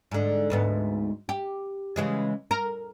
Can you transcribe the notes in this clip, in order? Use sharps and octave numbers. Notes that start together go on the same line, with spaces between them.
G#2 D3
D2 G#2 B3
G4
C#3 E3 G#3
A#4